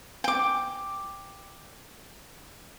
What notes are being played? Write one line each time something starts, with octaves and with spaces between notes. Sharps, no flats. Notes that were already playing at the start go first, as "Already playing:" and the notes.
G5 D6